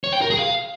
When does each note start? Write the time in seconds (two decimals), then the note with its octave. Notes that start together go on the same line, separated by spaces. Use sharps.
0.04 C#5
0.13 G5
0.21 A#4
0.30 G#4
0.39 F5